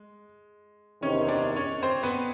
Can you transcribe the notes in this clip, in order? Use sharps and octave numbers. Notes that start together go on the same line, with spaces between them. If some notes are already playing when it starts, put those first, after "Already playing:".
Already playing: G#3
E2 C3 D#3 C#4 C#5
D4 D5
C#4 C#5
C4 C5
B3 B4